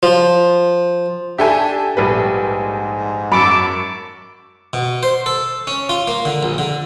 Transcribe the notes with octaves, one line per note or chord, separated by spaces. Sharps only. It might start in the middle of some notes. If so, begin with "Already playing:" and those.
F3
D4 G4 A4 E5 G#5
A#1 G#2 G3 B4
F#2 A5 B5 C#6 D6 E6
B2
C5
A4
C#4
F4
A#3
D3
A#1
D3